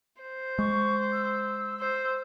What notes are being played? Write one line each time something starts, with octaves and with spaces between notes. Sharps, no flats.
C5
G#3 C#6
E6
C5